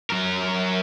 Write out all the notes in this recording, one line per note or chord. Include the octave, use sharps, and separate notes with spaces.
F#3 A#4